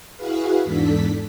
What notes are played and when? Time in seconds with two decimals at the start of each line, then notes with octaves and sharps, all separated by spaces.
0.16 E4 F#4 G#4 B4 F5
0.65 E2 G#2 D4 A4 B6